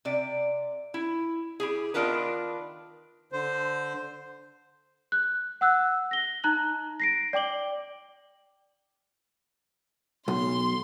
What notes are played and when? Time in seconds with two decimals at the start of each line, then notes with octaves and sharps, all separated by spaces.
0.05 C3 D5
0.94 E4
1.60 E4 G4 G#4
1.94 D#3 B3 D4 F4 A#4 B4
3.32 D3 C5
5.12 F#6
5.61 F#5 E6 F#6
6.11 A#6 G7
6.44 D#4 A#5 F#6 F#7
7.00 A#6 C7 D7
7.33 D5 G5 D6 F#7 G7
10.28 B1 C6